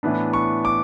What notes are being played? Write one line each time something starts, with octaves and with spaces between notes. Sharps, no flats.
A2 E3 B3 D4
C#6
D6